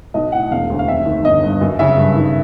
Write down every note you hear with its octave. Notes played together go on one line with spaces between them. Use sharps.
B1 D#5
A2 F#5
E1 F5
D2
F5
F1 E5
D#2
G1 D#5
G2
F#2
C#3 E5
G2
D#3